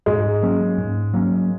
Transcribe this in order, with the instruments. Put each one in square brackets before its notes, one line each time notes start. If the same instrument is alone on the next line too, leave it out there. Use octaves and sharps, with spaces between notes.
[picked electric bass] G#2 [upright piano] G#3
[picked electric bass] F#3 A#3 C#4
G#2
F#3 A#3 C#4